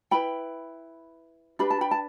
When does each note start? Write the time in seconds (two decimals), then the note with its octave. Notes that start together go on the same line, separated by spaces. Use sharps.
0.11 E4 B4 G5 B5
1.59 D4 G4 B4 B5
1.70 A5
1.81 G5 B5
1.91 A5